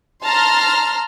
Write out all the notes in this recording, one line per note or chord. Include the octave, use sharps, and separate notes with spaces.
A5 A#5 C6 F6